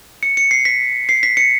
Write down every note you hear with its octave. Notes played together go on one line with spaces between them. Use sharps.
C#7
C#7
C7
B6
C7
B6
C#7